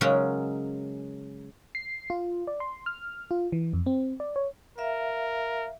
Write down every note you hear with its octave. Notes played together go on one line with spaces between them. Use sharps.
C#3 F#3 G#3 C#4 A#4
C7
F4
D5
C6
F6
F4
E3
F2
C4
D5
C#5
A#4 E5 F5